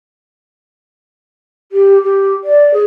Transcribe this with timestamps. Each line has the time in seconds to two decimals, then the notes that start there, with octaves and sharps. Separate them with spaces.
1.72 G4
2.03 G4
2.44 D5
2.74 G#4